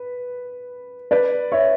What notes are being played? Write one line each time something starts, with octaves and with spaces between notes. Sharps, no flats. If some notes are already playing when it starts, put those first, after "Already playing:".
Already playing: B4
B4 D5
C#5 E5